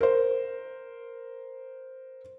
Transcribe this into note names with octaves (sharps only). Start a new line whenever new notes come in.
A#4 C5